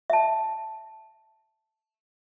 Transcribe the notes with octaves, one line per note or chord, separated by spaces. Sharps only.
E5 A5